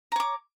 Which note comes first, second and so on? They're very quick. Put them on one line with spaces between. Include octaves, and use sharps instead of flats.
A#5 C#5 D6